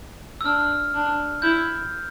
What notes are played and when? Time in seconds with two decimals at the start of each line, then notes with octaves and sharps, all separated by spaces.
0.41 E6
0.45 D4 F6
0.94 D4
1.42 E4 G6